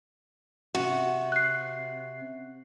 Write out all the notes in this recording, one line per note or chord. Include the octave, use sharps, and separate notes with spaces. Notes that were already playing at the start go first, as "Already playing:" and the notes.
C3 F#4
F#6 C7